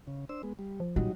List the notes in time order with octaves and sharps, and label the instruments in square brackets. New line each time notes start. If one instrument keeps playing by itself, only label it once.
[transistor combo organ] C#3
D4 C5 E6
G#3 B3
G3
[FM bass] F3
[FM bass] A#2 [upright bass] F#3 [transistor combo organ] G3 D#4 F#4